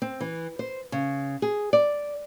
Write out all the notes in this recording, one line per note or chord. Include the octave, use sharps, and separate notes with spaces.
C4
E3
C5
C#3
G#4
D5